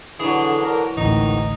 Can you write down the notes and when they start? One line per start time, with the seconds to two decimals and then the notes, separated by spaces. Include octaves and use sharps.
0.20 D3 E3 F#3 G#4
0.57 D3 A#4
0.97 A1 D2 G#2 D#3 D#4